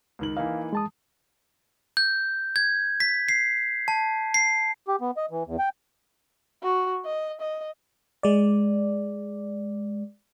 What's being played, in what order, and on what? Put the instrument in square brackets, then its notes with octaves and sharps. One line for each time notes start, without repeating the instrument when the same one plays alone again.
[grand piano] C#2 D#3 F#7
[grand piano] E3 A#3 D#4 [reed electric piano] F5
[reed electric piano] G#3 A5 D#6
[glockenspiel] G6
G#6
B6
C7
A5
C7
[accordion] G4
B3
D#5
E3
E2
G5
[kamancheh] F#4
D#5
D#5
[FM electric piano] G#3 D5